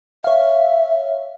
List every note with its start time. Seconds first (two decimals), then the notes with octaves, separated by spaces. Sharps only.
0.24 C#5 E5 F5